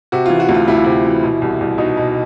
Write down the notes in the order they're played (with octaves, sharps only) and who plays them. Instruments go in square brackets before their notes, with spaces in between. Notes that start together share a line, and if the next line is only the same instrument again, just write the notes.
[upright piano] C3 F#4
E3 F4
F#4
D2
F4
D2 E4
F4
C3 E4
E3
B2
C2
C2
B2 D#4
B2